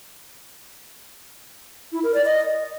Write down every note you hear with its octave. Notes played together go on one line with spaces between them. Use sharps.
E4
A#4
D5
D#5